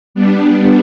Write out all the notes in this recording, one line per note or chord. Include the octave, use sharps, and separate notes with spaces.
G3 B3 D4